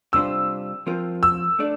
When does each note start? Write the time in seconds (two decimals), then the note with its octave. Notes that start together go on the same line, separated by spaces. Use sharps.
0.13 C3 G3 D4 F4 C5 E6
0.87 F3 C4 F4 A#4
1.23 E6
1.59 A3 D4 A4 D5